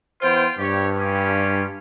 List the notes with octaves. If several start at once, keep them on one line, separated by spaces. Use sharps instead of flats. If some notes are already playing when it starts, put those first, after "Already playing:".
E3 B3 F4 C5 G5
G2 G4 C#5
C#4 F4 G4